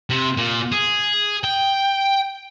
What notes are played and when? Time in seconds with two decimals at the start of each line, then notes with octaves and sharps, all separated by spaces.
0.10 C3
0.37 A#2
0.72 G#4
1.44 G5